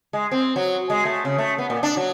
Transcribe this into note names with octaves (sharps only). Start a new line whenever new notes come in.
G#3
C4
F#3
G#3
A3
C#3
A3
B3
A#2
D4
F#3